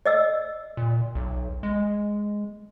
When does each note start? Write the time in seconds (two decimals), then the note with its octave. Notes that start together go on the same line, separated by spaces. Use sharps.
0.06 D5 D#5 E6
0.77 A#2
1.15 B1
1.63 G#3